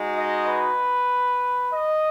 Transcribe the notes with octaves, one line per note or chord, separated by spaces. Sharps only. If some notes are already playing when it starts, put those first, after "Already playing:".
Already playing: G#3 D#4 F#4
D#5
B4
D#5